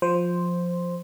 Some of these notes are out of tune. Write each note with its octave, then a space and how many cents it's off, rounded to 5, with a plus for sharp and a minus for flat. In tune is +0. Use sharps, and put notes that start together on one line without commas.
F3 +15 C5 +0